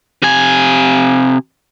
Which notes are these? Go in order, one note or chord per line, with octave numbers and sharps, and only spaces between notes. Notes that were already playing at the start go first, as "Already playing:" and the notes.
C3 G#5